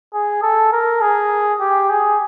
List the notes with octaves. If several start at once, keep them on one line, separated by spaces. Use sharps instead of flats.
G#4
A4
A#4
G#4
G4
G#4